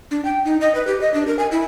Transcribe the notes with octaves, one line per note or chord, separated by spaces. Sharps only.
D4
G5
D#4
D#5
B4
G4
D#5
D4
A#4
G#5
E4